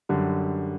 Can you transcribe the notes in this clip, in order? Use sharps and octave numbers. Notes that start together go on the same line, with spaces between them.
F#2 D3 G3